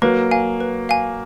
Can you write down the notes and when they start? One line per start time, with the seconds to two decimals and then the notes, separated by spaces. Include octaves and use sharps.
0.02 F#3 A#3 B4
0.31 F5 G#5
0.60 B4
0.89 F5 G#5